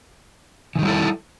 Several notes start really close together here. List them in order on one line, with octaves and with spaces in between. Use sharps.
E3 D#3 G3 E4 A4